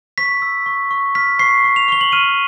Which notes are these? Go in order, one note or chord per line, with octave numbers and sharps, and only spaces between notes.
C#6 B6
E6
C#6
C#6
F6 B6
C#6 C7
C#6
F7
C#6 G7
F#7
F6 D#7